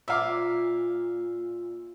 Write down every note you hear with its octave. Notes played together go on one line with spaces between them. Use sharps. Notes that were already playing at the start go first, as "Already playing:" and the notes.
A#2 E5 F5 D6